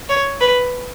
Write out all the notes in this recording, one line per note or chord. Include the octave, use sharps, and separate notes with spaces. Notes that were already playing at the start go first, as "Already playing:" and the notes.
C#5
B4